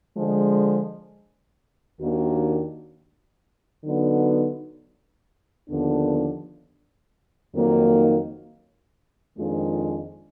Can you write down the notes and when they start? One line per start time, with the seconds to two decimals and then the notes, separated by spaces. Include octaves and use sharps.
0.17 D3 F3 G#3
2.00 D#2 D#3 A#3 D4 F#4
3.85 D3 F#3 B3 D#4 F#4
5.69 D#2 D3 F3 B3 D4
7.53 F2 D#3 F#3 A#3 D#4
9.37 F2 D#3 G#3 D4 F4